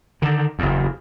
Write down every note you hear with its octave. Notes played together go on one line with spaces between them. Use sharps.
D3 D#3
F#1 E2